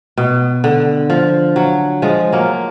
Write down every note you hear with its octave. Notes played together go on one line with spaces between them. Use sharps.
B2
D3
F3
F#3
F3 G#3
F#3 A#3